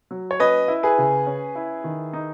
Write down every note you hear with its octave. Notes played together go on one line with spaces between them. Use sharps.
F#3
C#5
C#4 B4 D#5
E4
G#4 B4
C#3
C#4
E4
D#3
D#4